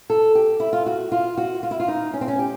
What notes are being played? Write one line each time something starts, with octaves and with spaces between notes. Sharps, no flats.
A4
G4
E4
F4
F#4
F4
F#4
F4
E4
F4
D#4
C#4
C4
C#4
G4